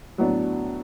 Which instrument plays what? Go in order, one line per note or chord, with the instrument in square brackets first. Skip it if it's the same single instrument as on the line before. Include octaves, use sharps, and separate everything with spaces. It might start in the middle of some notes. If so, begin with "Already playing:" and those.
[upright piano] A2 F#3 B3 D4